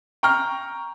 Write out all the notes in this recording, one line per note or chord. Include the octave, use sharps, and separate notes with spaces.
G5 A#5 C#6 F6